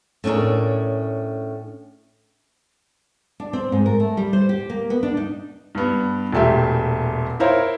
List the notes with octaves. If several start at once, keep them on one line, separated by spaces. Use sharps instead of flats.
A2 C#4 D4 G#4 A#4
D4
C4
G#2
A#4
A3
G3
C5
G4
A#3
B3
D4
D#4
G2 B3
E1 A#2 A3 G4 E5
E4 A#4 C5 C#5 F5